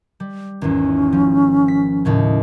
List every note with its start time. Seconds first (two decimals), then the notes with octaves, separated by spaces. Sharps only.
0.20 G3
0.61 G#1 E2 C#4
1.13 F3
1.68 B6
2.05 D#2 A2 C#3